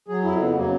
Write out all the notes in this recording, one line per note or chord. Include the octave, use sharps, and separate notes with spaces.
F#3 G#4
F2 E4
C#3 B3
F#3 A#3